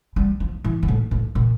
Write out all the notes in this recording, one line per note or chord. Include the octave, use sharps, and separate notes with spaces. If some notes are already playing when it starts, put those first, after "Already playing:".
G3
F3
E3
A#2
A2
A2
A#2